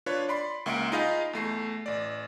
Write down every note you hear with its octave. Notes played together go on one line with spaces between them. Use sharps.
D4 F4 B4 C#5
D5 B5 C6
C#2 A#3 E5 F#5 C6 D7
D#4 F4 G#4 D#5 F5 B5
E2 A3 C7
A1 D5